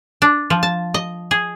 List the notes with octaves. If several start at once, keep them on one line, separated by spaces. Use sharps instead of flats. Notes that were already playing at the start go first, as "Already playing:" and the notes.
D4
F3
A5
D#5
G#4